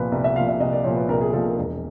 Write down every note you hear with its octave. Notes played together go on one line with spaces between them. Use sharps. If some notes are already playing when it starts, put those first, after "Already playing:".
Already playing: C2 A#2 F3 B4
C2
E5
A#2 F3 F5
E5
C2 D#5
D5
A#2 F3 C#5
B4
C2 A#4
G#4
A#2 F3 A4
A#4
E1